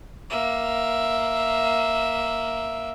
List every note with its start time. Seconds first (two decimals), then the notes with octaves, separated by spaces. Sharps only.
0.30 A#3 E5